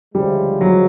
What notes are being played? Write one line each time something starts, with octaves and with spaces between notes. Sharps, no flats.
D2 C#3 F3 G3 G#3
F#3